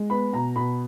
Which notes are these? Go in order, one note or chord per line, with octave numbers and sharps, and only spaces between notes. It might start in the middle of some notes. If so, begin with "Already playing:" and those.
Already playing: G#3
B3 B5
B2 A#5
B2 B5